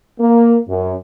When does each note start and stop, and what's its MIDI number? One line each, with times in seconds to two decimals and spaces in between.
0.20 0.57 58
0.69 0.93 42